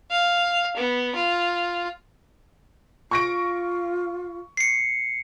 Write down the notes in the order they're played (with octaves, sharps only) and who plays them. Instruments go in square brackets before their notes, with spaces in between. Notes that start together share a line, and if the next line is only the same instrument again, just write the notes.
[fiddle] F5
B3
F4
[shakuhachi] F4 [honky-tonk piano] C#6 A#6 D7
[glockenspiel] C7 C#7